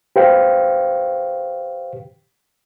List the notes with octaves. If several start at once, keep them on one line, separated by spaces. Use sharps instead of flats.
G4 B4 C5 F5 G5